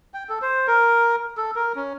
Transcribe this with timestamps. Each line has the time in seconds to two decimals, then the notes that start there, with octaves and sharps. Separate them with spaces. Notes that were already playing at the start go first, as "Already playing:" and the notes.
0.14 G5
0.29 A4
0.42 C5
0.67 A#4
1.37 A4
1.56 A#4
1.76 C#4